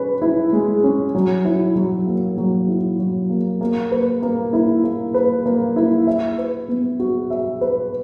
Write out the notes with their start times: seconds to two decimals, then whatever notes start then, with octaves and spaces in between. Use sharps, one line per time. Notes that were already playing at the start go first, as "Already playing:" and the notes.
Already playing: C#4 B4
0.22 E4
0.53 G#3
0.83 C#4
1.15 F#3
1.45 E4
1.76 F#3
2.07 A#3
2.38 F#3
2.68 E4
2.99 F#3
3.30 A#3
3.61 A#3
3.91 B4
4.22 A#3
4.53 E4
4.84 A#3
5.14 B4
5.46 A#3
5.76 E4
6.07 E5
6.38 B4
6.68 B3
7.00 F#4
7.30 E5
7.61 B4